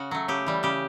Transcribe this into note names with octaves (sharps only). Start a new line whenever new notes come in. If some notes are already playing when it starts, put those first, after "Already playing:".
Already playing: C#3 F#4
F#3 A3
C#3 G4
E3 G3
C#3 G4